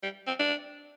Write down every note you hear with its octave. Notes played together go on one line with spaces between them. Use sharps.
G3
C4
D4